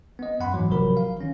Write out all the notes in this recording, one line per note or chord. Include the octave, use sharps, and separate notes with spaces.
B3 D#5
F#2 F#5 B5 C6
G#2 E3 F#3
A1 C3 F3 F#3 A#4 B5
F5
D#3 C#4